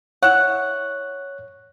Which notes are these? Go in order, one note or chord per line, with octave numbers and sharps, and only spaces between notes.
E4 C#5 F#5 F#6